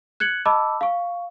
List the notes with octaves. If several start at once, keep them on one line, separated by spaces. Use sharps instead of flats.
F#6 G#6 C#7 F#7
D#5 A5 B5 D6 E6
F5 C#6